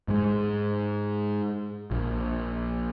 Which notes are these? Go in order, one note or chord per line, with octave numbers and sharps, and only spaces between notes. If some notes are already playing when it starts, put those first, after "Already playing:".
G#2 G#3
A#1